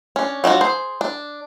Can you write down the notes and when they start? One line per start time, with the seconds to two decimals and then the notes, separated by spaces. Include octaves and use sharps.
0.16 C#4 D4
0.44 F#3 D4 F4 F#4
0.61 G#4 C5
1.01 D4